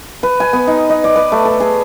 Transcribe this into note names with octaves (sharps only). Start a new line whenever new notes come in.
B4
G#5
B3
D#4
D#5
D5
B4
A3
A4
G#4